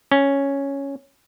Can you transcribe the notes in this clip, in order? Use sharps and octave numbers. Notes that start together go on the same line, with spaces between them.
C#4